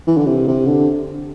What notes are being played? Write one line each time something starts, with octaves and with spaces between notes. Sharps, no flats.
E3
D3
C3
C3
D3